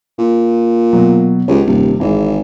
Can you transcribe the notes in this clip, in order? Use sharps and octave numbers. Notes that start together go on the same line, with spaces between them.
A#2
B2 F#3
C#2 F#4 G4 C#5
D#1 G2 C3
G#1 E3 G#3